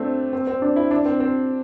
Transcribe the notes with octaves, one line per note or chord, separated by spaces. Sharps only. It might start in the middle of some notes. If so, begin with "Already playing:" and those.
Already playing: A3 C4 D4
C4
C4
D4
E4
D4
C4
C4